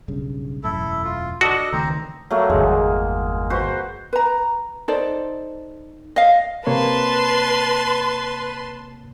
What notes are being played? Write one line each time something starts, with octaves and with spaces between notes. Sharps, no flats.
B1 G2 C#3
E1 F#2 A2 E4 A4
F4
D4 F#4 A4 D#5
C#2 D#3 A3 C4 C5 A#5
F#3 A3 A#3
G1 E2 G#3
F#4 B4 C5
B4 A#5
D#4 A4 C5 D5
D#5 F5
C3 A#3 B4 C#5 A5 C6